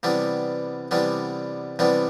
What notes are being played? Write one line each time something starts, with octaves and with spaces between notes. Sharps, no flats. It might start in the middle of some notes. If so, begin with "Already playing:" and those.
C3 E3 G3 B3 D4
C3 E3 G3 B3 D4
C3 E3 G3 B3 D4